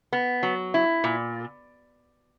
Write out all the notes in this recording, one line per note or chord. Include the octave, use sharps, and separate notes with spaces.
B3
F#3
E4
A#2